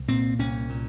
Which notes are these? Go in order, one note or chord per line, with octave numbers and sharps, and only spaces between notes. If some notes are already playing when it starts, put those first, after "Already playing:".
Already playing: C2
A#2 C4
C2 C#4
A#2